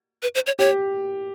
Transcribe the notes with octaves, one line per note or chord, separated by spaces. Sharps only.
B4
C5
C#5
G4 C#5